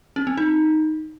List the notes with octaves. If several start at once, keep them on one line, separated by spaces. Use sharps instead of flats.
C#4
C4
D#4